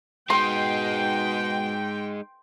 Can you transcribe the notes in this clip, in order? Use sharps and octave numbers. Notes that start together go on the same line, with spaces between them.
B2 G#3 D#4 G5 C6